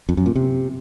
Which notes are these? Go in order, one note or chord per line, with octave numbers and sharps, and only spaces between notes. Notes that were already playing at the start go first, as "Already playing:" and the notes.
F2
F#2
A#2
C3